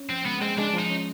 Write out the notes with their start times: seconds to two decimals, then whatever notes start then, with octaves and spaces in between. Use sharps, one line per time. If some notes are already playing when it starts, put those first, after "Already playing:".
Already playing: C#4
0.10 F3 C4
0.25 G#3 B3
0.42 G#3 C4
0.58 G#3 D4
0.74 F3 D#4
0.90 C#4